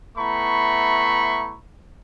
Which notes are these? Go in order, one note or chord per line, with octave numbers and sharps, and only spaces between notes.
A3 B3 E4 A#5 B5 C#6